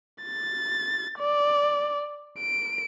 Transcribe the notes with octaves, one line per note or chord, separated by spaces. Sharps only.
A6
D5
D7